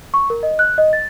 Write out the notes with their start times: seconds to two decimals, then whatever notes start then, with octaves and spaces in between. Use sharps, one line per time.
0.14 C#6
0.30 A#4
0.43 D#5
0.59 F#6
0.78 D#5
0.93 A6